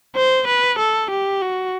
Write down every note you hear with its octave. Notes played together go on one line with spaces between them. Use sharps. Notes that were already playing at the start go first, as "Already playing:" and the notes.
C5
B4
A4
G4
F#4